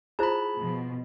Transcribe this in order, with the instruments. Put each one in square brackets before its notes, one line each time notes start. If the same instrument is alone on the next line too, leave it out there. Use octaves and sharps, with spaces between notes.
[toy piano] E4 F4 C5 [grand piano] G#4 [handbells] A5 B5
[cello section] B2 F3